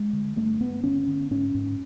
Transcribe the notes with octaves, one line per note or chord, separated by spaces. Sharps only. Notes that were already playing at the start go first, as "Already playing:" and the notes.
Already playing: G#3
D3
G2 A3
G2 B3
D3 C#4
D3
G#2 C#4
G#2